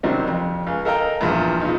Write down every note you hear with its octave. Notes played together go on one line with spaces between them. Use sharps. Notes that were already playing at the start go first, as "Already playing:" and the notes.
C3 D#3 F#3 G3 C4
F2
C#2
A4 A#4 D#5 F5 G5 A#5
E2 G2 A#2 E3 F3
A#2 C#3 D#4